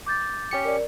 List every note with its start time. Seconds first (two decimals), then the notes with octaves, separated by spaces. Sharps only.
0.06 D6 G6 A6
0.51 C#4 G4 C#7
0.65 A#4 D5